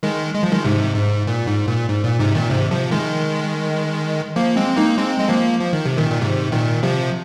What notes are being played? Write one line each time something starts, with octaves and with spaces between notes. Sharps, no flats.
D#3 G#3
G#3
F3
D#3 G#3
G#2 C3
G#2
A#2
G#2
A#2
G#2
A#2
G#2 C3
A#2 D#3
G#2 C3
C3 F3
D#3 G#3
F3 A#3
G#3 C4
A#3 D#4
G#3 C4
G#3
F3 A#3
F3
D#3
C3
A#2 D#3
A#2
G#2 C3
A#2 D#3
C3 F3